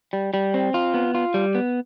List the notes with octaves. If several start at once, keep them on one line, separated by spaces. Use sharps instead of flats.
G3
G3
C4
F4
B3
F4
G3
B3